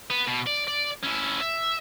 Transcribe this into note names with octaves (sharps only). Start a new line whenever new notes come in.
B3
B2
D5
D5
C#4 E4
E5